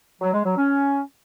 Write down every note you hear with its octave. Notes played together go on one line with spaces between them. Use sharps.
F#3
G#3
F#3
C#4